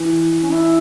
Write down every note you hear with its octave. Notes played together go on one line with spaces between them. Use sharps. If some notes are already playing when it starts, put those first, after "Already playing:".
Already playing: E3
C#4
E4